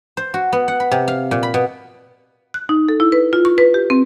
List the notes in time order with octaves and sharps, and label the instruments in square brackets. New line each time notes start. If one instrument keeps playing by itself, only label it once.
[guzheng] C5
F#4
B3
F#5
B5
C3
F5
A#2
B5
B2
[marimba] F#6
D#4
A4
E4
B4
F4
C#6
B4
G4
C4